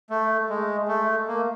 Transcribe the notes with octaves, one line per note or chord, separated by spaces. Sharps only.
A3
G#3
A3
A#3